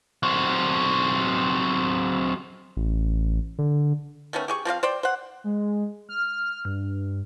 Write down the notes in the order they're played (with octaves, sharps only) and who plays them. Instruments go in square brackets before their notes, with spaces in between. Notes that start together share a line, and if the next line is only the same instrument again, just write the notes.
[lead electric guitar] F#3 C4
[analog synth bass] A1
D3
[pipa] D#3 A3 B3 C#4
G4 G#4 C#6
F3 C4 G4 F5
C5 D5 G5
C5 F#5
[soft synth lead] G#3
F6
G2